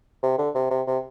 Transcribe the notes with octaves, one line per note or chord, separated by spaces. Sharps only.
C3
D3
C3
C3
C3